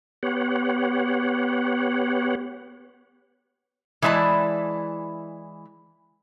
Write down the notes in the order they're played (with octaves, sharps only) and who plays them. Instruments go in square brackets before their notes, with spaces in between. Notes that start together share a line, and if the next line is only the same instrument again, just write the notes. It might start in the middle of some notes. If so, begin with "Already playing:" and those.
[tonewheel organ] B3 G4 C#5 F#5
[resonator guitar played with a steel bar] E3 G#3 E4 D5 A5